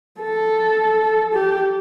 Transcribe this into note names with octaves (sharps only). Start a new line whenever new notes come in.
A4
G4